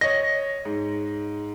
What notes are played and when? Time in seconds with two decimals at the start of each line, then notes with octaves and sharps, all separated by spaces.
0.01 C#5 D#5 A#6
0.65 G#2